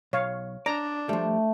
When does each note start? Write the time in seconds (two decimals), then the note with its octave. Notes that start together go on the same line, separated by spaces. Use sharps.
0.13 B1 C#5 F5
0.66 D4 D5 A#5
1.09 F3 G3 A3